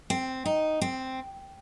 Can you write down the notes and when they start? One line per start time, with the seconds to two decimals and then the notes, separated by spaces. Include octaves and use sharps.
0.10 C4
0.46 D#4
0.81 C4